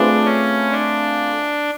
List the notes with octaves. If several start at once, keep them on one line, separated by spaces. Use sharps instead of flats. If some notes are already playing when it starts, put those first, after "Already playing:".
Already playing: A3 C4 D4 F4 G#4 B4
C#4
D4